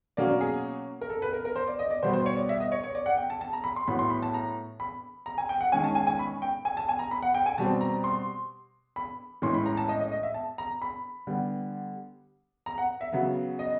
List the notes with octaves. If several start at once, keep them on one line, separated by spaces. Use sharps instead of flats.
B2 F#3 A#3 C#4 D5
G#4
A#4
A4
B4
A#4
A#4
C5
D5
D#5
D5
B2 G3 B3 C5
C5
C#5
D5
E5
D#5
C#5
C#5
D5
F#5
G5
A5
A5
A#5
B5
C6
A2 F#3 B3 B5
C6
B5
A5
A#5
B5
A#5
G#5
G5
F#5
D#3 G#3 C#4 G#5
A5
G#5
G#5
B5
G5
G#5
A5
G#5
A#5
B5
F#5
G5
G#5
B2 G3 C4 A5
A#5
C6
B5
A2 E3 G#3 C#4 C6
B5
A#5
A5
D#5
D#5
D#5
E5
A5
A#5
B5
D3 G3 B3
A#5
F#5
E5
C#3 F#3 B3
D#5